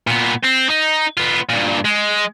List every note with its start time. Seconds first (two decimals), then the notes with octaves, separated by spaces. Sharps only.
0.07 A#2 B3
0.43 C4
0.69 D#4
1.18 B3 F4
1.49 G2 A#2
1.85 G#3